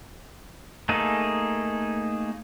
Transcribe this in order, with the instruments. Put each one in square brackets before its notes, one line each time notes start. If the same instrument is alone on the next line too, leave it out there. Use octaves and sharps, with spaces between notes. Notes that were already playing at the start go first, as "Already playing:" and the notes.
[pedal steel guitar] A3 A#3 D#4 G#4 A4